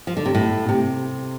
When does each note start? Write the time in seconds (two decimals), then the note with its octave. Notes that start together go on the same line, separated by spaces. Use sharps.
0.07 F3
0.17 D3
0.26 C3
0.35 A2
0.69 C3